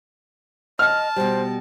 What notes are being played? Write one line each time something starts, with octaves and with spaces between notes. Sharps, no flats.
D#5 A5 F6
B2 G3 C5